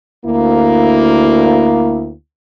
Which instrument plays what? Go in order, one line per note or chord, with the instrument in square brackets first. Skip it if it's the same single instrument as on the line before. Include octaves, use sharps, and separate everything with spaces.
[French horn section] D2 A#3 E4